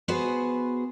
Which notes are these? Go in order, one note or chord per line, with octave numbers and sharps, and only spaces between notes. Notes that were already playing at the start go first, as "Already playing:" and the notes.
B3 F#4 G#4 B4 C5